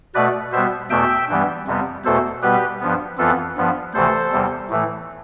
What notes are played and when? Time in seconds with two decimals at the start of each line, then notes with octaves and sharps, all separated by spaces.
0.15 B2 A3 B4 D5
0.52 B2 G3 B3 C5 E5
0.90 E2 B2 A3 E5 G5
1.29 G2 E3 G3 B3
1.67 F2 C3 G3 B3
2.05 E2 B2 A3 A4 C5
2.42 B2 G3 B3 G4 B4
2.81 G2 F3 B3
3.18 F2 E3 B3 F4 A4
3.57 G2 F3 B3
3.94 D2 C3 E3 A3 A4 C5
4.33 E2 C3 G3
4.70 A2 E3 A3